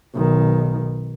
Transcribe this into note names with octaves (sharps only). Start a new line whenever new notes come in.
B1 D#3